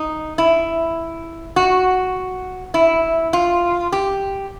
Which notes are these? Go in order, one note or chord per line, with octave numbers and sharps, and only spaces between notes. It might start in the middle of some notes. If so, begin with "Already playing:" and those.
Already playing: D#4
E4
F#4
E4
F4
G4